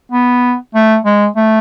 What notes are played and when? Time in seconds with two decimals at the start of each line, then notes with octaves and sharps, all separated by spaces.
0.12 B3
0.75 A3
1.05 G#3
1.36 A3